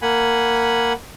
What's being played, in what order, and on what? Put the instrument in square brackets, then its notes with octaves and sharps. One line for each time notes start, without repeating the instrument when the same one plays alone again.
[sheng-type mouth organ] A#3 F#5 G#5 B5